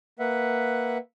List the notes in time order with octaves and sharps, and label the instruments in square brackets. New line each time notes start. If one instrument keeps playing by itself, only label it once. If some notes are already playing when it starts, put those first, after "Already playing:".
[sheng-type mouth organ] A#3 B4 E5 F#5